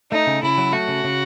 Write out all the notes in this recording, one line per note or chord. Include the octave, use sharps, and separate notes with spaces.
A3 D#4
C#3
C#3 E4
F#3
A3 F#4
C#3
C#3